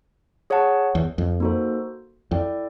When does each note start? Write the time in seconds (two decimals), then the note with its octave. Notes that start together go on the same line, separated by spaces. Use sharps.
0.50 G#4 C#5 F#5 A5
0.95 E2
1.18 F2
1.40 A#3 D#4 F#4 A4 C5
2.31 F2 E4 A4 D5 G5